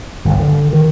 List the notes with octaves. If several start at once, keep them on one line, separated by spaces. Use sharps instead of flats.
G1
D3
D#3